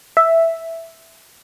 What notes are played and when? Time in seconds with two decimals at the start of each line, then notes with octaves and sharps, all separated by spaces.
0.17 E5